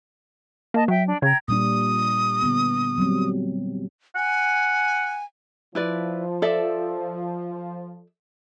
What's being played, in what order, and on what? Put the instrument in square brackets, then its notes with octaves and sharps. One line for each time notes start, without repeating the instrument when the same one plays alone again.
[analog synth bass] A#3 [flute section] D#5 A5
[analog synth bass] F#3 [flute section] E5 G5
[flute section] D4
[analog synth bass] C#3 [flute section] G5 A#5 G#6
[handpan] A#2 G3 D4 [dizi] D#6
[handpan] D3 B3
F#3 G3 C4
[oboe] F#5 [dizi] G#5
[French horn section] F3 [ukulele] E4 B4 D5
[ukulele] A4 D5 E5